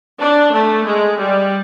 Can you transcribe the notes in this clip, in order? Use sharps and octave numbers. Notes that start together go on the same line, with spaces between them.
D4
A3
G#3
G3